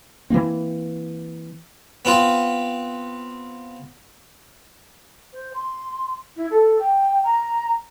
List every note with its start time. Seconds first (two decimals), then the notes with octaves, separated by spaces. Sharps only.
0.30 E3 F3 A#3 C4
2.05 B3 C4 F4
5.32 C5
5.53 C6
6.36 E4
6.50 A4
6.79 G5
7.23 A#5